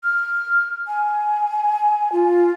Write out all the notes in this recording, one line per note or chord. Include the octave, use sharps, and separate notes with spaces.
F6
G#5
F4